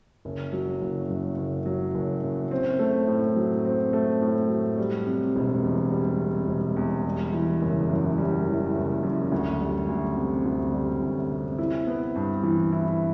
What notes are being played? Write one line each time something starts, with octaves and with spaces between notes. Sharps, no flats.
F#1
F#3
F#1
F#2
F#1
F#3
F#1
F#2
C4
A3
A2
F#3
C4
A3
A2
F#3
G3
C3
E1
E2
G3
C3
E1
E2
G3
E3
F#1
F#2
G3
E3
F#1
F#2
D2
G3
D2
C3
D2
G3
D2
C3
E4
B3
G2
E3
E4